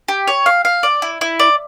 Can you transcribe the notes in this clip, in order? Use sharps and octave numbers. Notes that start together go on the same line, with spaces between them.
G4
C#5
F5
F5
D5
E4
E4
D5